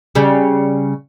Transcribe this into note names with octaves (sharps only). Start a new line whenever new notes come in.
C#3 G3